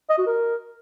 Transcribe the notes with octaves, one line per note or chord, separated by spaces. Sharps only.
D#5
F#4
A#4